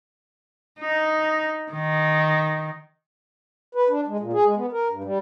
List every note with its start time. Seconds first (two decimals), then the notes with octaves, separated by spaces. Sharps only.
0.80 D#4
1.72 D#3
3.75 B4
3.89 D4
4.07 G#3
4.20 A#2
4.33 G#4
4.45 G#3
4.57 B3
4.72 A#4
4.89 G2
5.04 G3